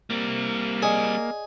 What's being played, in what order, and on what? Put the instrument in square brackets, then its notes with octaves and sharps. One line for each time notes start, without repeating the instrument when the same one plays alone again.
[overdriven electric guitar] G3 C4 [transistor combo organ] A#3
[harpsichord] G#4 [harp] D5 D#5 A6